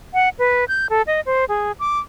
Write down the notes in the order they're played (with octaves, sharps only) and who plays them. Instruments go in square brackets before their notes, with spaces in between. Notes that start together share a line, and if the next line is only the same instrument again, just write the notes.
[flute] F#5
B4
G6
A4
D#5
C5
G#4
D6